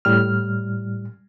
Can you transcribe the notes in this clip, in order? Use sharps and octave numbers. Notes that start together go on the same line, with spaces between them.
A2 G3 F6